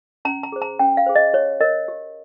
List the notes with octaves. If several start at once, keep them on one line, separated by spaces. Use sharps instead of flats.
C#4 A#5
A#5
G#4 C5
A#5
C#4 G5
F5
G#4 C5
D#5
G4 C#5
A#4 C#5 D#5
G4